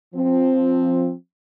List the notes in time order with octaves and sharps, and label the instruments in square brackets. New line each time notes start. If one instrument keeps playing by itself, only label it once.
[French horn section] F3 C4